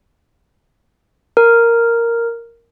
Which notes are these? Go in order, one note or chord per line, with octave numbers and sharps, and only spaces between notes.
A#4